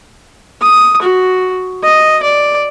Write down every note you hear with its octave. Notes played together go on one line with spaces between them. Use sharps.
D#6
F#4
D#5
D5